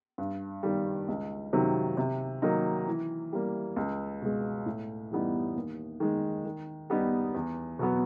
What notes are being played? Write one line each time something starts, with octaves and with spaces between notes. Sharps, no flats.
G2
D#3 G3
C#2
C3 D#3 F#3
C3
D#3 F#3 A#3 D#4
E3
G3 A#3
C#2
B2 G#3
A2
E3 G3 B3 D#4
D#2
D#3 G#3
D#3
G3 B3 D#4
E2
B2 F#3 B3